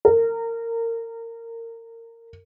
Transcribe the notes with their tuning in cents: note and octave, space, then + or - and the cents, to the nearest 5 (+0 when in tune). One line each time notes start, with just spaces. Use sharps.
A#4 -25